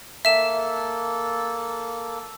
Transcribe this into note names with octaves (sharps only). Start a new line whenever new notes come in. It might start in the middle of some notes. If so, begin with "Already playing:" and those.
A#3 A4 E5 E7